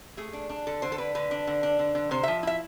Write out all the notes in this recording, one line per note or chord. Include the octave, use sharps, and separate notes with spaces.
A3 G#4
D4
D4
D3 A4
D3 C5
A4
D4 B4
D3 B4
D4
D3
D4
D3
D3
C3 C5
F3 E5
E4 E5